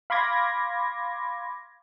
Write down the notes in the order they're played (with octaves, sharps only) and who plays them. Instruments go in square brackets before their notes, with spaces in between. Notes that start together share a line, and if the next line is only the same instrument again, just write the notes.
[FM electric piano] F5 B5 C6 D6 G#6 A#6